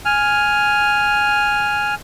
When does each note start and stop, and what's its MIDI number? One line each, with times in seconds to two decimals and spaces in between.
0.05 1.95 80
0.05 1.95 89